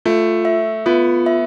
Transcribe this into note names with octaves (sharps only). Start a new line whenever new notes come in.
A3 F4
E5
B3 F4
E5